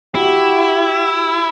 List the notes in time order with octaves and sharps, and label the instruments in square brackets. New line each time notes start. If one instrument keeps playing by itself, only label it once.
[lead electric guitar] E4 [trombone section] F#4 G4